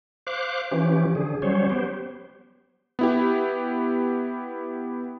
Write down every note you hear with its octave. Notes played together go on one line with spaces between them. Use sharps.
C5 F5 D6 F#6
E3 F3 C#4 G4
D3 G#4
F#3 G3 C#4 C5 C#5
B3 G4 C5
B3 E4 G4